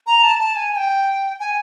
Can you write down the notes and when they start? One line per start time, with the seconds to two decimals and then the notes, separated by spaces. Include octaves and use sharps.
0.07 A#5
0.23 A5
0.40 A5
0.56 G#5
0.73 G#5
0.77 G5
1.40 G#5